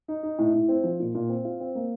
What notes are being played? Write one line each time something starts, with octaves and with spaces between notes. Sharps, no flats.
D#4
D#4
A2
A2
C4
F3
A#2
A#2
C4
F4
C4
A#3